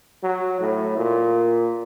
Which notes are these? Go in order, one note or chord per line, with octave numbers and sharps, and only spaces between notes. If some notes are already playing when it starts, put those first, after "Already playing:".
F#3
A2
A#2